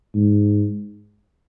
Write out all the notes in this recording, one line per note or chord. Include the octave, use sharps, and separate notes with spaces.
G#2